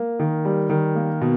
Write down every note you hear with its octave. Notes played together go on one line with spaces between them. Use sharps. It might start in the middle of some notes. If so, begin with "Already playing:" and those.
Already playing: A#3
D#3
G3
D#3
A#3
B2